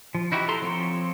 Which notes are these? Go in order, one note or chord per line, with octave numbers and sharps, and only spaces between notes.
F3
D#4 E4 F#4 G4
A4 A#5 C6
F3 C4 C#5